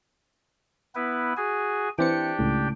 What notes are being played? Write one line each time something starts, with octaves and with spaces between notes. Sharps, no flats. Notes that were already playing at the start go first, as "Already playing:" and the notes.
B3 E4 B4
F#4 G#4 G#5
E3 C4 D4 G4 G5 C#7
C#2 A2